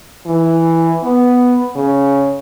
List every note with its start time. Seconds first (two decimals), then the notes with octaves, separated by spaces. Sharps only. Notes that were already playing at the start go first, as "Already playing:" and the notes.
0.26 E3
1.03 B3
1.76 C#3